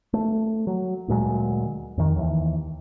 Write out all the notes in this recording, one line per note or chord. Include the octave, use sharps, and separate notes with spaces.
A3
F#3
D2 A#2 F#3 G#3
F2 D#3
D#2 E3